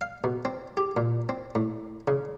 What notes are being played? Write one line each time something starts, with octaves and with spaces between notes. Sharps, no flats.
F5
B2
C4
G4
A#2
C4
A2
C#3